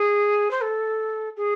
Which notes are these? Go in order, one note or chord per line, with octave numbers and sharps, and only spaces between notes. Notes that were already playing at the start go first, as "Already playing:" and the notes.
Already playing: G#4
C5
A4
G#4